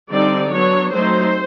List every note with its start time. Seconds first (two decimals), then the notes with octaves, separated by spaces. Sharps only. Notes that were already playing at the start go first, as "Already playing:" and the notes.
0.10 D3 G3 C4 D#4 D5
0.51 F#3 B3 D4 C#5
0.91 F#3 A3 C4 D#4 C5